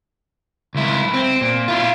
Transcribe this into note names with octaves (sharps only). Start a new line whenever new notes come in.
C#2 E4
C4
A#2
E4 F4